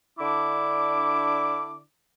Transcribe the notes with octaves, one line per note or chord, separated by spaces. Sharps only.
D3 D4 E4 D6